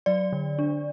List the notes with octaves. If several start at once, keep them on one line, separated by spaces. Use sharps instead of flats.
F#3 D5
D3
D4